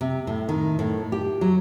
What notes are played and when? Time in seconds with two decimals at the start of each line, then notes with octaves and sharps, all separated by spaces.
0.01 C3
0.27 A2
0.49 D#3
0.79 A2
1.12 G4
1.41 F#3